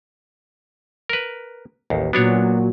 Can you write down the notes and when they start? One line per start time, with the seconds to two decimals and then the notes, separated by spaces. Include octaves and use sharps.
1.10 A#4 B4
1.90 A1 D#2
2.13 A#2 F#3 B3 D4 C#5